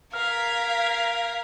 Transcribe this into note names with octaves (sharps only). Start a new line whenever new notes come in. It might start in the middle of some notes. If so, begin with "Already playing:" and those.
A#4 F5 F6 G#6 B6